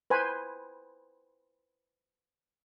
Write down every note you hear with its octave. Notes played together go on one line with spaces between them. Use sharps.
B4 C5 G#5